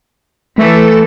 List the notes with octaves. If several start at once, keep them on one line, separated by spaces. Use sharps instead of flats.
E3 A3 A4